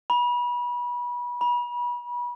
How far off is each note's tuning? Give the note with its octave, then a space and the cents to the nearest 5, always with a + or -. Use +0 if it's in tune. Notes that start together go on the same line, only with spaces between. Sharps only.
B5 -30
B5 -35